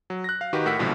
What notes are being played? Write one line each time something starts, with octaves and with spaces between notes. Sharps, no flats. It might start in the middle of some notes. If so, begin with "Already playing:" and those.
F#3
F#6 A#6
F5
D#3 D#4 F#4 G4 B4
A2 A#4 F#5 E6 B6
A#1 B2 D3 E3 F3 G3